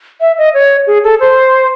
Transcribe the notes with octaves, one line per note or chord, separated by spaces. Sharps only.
E5
D#5
C#5
G#4
A4
C5